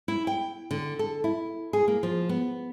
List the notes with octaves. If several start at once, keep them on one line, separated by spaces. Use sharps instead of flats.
E4
G5
D3
A4
E4
G#4
A#3
F3
B3